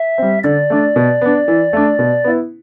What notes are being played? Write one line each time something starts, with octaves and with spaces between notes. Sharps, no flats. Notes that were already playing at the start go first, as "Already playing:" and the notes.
Already playing: E5
G3 C4
D3 D5
A3 D4
B2
B3 D4
E3
A3 D4
B2
B3 E4